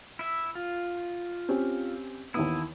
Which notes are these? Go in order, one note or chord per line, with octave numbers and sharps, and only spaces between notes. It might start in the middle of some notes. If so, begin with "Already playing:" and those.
E4 E5
F4
C4 C#4 G4
D#2 E3 B3 E4 D#6